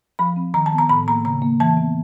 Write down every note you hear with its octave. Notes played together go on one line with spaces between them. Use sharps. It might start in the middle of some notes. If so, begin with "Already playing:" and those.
F3 B5
C4
D#3 A#5
A5
B3
A#5
A2 B5
A#3 A#5
C#3 A#5
A#3
E3 A5
B3